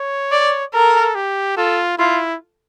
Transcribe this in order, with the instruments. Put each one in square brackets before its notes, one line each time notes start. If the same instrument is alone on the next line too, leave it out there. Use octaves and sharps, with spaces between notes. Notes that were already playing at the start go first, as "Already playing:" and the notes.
Already playing: [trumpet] C#5
[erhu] D5
[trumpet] A4 [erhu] A#4
[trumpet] G4
[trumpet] F4 [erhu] A4
[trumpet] E4 [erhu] F4